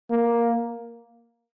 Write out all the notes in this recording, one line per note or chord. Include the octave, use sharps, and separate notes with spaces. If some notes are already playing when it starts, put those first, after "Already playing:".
A#3